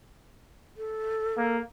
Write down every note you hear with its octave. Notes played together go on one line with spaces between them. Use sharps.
A4
A#3